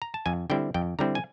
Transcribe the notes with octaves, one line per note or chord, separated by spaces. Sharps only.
A#5
A5
F2 G#5
D3 G3 C4 E4 G5
F2 G5
D3 G3 C4 E4 A#5
G#5